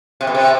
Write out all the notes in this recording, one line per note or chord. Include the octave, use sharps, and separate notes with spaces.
C3
B2
C3